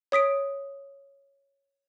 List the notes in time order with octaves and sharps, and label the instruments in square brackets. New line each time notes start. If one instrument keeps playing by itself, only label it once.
[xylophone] C#5 D#6 B6 D7